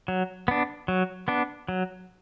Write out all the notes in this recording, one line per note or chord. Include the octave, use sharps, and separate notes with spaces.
F#3
B3 D4
F#3
B3 D4
F#3